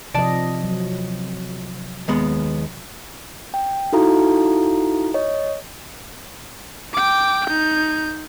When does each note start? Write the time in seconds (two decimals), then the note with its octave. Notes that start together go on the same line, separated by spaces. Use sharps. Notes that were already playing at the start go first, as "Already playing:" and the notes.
0.15 C3 F3 D5 D#5 A5
0.64 F#3
2.08 D#2 G#3 B3
3.54 G5
3.93 D#4 E4 F#4 A4 F5 A#5
5.14 C#5 D#5
6.94 G5 D6
7.48 D#4 G6